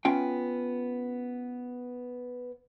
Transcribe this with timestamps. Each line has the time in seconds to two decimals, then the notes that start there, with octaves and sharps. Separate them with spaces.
0.05 B3 C#4 F4 G5